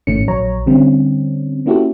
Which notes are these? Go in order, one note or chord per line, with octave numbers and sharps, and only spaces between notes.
G#1 A2 D#3 A3 C#4 C#7
A#1 F#3 C#5 A#5
D3 G3 C4 C#4
A#3 C#4 E4 F#4 G4 A4